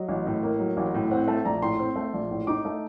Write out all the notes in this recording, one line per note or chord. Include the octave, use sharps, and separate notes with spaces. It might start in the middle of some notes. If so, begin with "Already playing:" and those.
Already playing: F#3 D#5
A1
A2
A#3
F#3
A1
A2
C4 F#5
A3 A5
A#1 A#5
A2 C6
C4
A3
A#1
A2
D#4 D6
A3